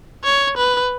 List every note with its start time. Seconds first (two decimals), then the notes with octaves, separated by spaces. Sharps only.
0.24 C#5
0.57 B4